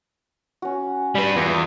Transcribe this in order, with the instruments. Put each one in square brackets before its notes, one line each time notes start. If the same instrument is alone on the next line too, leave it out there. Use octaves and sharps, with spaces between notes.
[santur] C#4 F#4
[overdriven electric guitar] G3 B4
[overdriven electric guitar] E2 [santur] F4